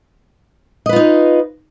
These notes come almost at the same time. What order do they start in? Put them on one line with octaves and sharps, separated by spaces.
D#5 B4 F4 D#4